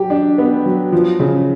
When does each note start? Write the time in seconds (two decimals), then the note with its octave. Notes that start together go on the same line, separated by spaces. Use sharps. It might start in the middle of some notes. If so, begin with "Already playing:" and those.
Already playing: F#3 G4
0.10 D4
0.38 B3
0.66 F#3
0.92 F3
1.20 C#3